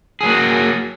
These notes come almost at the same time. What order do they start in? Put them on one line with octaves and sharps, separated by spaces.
G#4 F#3 A#3 F#4